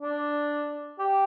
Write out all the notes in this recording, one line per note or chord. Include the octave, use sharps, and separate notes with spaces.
D4
G4